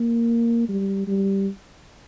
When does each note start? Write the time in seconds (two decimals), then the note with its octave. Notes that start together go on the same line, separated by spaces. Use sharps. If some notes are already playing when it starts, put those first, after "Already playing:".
Already playing: A#3
0.69 G3
1.07 G3